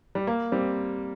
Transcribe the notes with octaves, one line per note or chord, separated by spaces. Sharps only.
G3
A#3
G3 C4